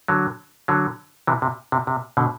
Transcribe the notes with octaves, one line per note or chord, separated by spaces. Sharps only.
D3 F#3
D3 F#3
C3 E3
C3
C3
C3
B2 D3